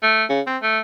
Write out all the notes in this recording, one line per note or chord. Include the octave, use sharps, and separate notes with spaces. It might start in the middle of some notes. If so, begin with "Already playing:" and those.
A3
C#3
C4
A3